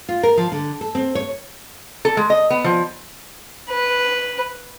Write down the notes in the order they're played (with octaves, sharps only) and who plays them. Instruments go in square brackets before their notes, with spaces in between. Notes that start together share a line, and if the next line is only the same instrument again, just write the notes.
[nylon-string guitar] F4
A#4
F3
D3
A4
C4
C#5
[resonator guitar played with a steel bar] A4
G#3
D#5
B3
F3
[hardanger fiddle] B4